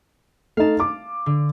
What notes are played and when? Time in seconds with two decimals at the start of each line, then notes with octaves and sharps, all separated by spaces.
0.57 A3 D#4 F5 A5
0.80 D6
1.26 D3